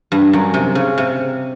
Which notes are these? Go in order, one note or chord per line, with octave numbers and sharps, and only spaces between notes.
G2
F#2
C3
C#3
C3